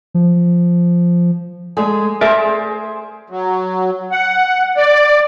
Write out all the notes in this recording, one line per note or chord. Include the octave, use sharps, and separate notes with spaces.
F3
G#3 A3 G#4 D5 G#5
A3 G#4 A#4 C5 D5 E5
F#3
F#5
D5